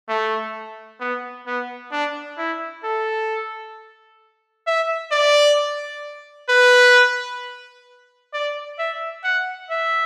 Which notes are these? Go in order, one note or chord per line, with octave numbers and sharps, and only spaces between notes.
A3
B3
B3
D4
E4
A4
E5
D5
B4
D5
E5
F#5
E5